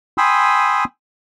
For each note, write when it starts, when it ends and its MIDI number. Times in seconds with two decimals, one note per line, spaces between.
0.18 0.84 79
0.18 0.84 80
0.18 0.84 83
0.18 0.84 84
0.18 0.84 87
0.18 0.84 88